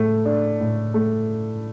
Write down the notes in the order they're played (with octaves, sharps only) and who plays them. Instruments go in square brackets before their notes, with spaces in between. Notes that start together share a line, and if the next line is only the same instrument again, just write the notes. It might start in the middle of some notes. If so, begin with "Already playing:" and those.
Already playing: [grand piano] A2 A3
D4
A2
A3